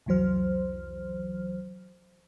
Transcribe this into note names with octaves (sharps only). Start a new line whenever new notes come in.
C2 F2 E3 F#3 C5 F6